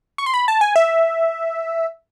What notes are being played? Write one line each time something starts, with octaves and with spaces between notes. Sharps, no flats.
C#6
C6
B5
A5
G#5
E5